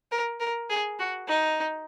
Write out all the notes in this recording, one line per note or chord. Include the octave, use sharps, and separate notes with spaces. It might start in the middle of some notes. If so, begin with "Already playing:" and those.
A#4
A#4
G#4
F#4
D#4